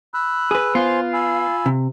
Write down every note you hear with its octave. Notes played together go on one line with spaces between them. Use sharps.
B5 E6 F#6
G#4 B4
B3 F4 C5 G#5 C6
G#5 B5 E6
C3